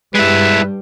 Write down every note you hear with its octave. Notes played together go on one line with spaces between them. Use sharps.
G2 G3 G#3 E4 B4